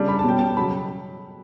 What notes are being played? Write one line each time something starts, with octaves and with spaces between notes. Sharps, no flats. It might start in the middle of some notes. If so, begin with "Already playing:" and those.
Already playing: C#3 G3 D4
B5
A5
B2 G3 C#4 G5
A5
C#3 F#3 B5